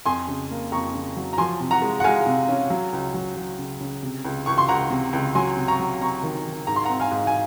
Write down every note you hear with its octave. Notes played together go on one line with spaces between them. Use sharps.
F2 G#5 C6
C#3
A#3
F2 A#5 C#6
C#3
F#3
A#5
F3 G#5 C6
C3
F#5 A#5
G#3
F#5
G#3 F5 G#5
C3
C#4
F#3
C#2
F#3
F#3
C#3
C#3
C3
C#2
C#2 C#6
C6
C#2 F#5 A#5
C3
C#2
F#3 G#5 C6
C3
A#5 C#6
F#3
C3 A#5 C#6
D#3
D#3
G#2 A#5
C6
F#5 A#5
C4
F5 G#5
G#2
G#5